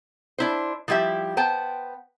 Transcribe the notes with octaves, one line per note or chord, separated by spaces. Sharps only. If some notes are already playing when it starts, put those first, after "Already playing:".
D4 E4 C5
F3 G3 E4 G4 E5
B3 C5 G5 A5